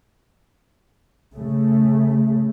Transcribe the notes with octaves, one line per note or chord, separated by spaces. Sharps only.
C#3 A3